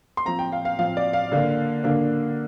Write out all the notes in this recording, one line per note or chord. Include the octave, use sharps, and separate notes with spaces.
C6
F3 C4 A#5
G5
F5
F5
F3 C4 F5
D5
F5
D3 A#3 D4
D3 A#3 D4